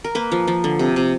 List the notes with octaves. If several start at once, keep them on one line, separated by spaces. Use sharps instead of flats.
A#4
A#3 B4
F3
F3
D3
C3
C3